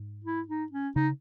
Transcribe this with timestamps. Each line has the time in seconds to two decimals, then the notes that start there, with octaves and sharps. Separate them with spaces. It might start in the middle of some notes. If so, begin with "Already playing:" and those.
Already playing: G#2
0.25 E4
0.48 D#4
0.72 C#4
0.96 C#3 D#4